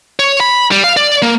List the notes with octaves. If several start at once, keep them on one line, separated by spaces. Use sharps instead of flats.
C#5
B5
G3
F5
D5
A#3